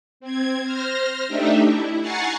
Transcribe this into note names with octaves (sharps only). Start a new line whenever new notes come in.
C4 G#6
C5 F6 A#6
A3 D4 D#4 G4 E5
E4
F#5 G#5 A#5 C#6 A6 C7